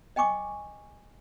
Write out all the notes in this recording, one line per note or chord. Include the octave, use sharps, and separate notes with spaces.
D#5 G5 G#5 C#6 D6